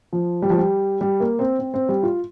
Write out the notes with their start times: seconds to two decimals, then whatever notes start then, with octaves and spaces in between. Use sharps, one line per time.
0.13 F3
0.42 G3
0.50 F3
0.58 G3
1.01 G3
1.20 A#3
1.39 C4
1.59 C4
1.74 C4
1.89 G3
2.03 F4